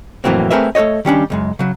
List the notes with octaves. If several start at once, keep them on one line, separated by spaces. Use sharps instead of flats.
F2 A2 E3 F#3 A#3 C4
A3 C4 G#4 A#4 B4 E5
A3 A4 C5 C#5 D#5
D#3 G3 C#4 D4
C#2 F#2 G#3
C#3 F#3